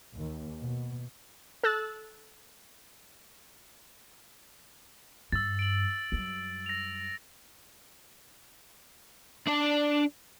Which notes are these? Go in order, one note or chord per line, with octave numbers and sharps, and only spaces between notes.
D#2
B2
A4 E6 F#6 A6
G2 E6 A6
D7 F#7
F#2 G3
A#6 F7
D4 D5